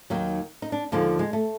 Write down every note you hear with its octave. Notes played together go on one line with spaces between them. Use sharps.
D#2 D#3 F#3
D#4
D4
D#2 D3 F3 G#3
G#3
A3